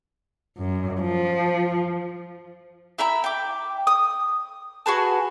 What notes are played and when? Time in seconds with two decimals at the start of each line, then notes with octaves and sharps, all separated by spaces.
0.58 F#2
1.01 F3
2.99 E4 E5 A#5 B5
3.24 G5 D6
3.87 D#6
4.86 F#4 G#4 B4 A5